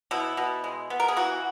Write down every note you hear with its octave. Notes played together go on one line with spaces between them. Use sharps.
B2 E4
B2
G#3
B3
A#4
G#4
E3 F#4